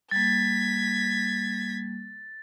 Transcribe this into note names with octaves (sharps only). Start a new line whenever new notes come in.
G3 A#3 G#6 A6 B6